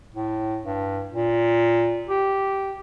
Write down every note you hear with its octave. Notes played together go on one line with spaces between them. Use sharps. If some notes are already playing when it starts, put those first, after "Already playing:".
A2
G2
A#2
G4